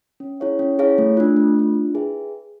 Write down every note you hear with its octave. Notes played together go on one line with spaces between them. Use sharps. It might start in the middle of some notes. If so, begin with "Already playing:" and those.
C#4
E4 G#4 C#5 F5
C#4
E4 G#4 C#5 F5
A3
D4 F4
A3
D4 F4
E4
G#4 B4 E5 G5